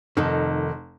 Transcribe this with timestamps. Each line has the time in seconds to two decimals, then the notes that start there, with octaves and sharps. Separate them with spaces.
0.17 F1 D#3 D#4 A4